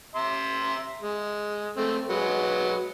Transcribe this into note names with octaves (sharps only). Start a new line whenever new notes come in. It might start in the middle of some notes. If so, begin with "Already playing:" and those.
E5 A#5 C6
G#3
A3 C4
F#3 G#3 B4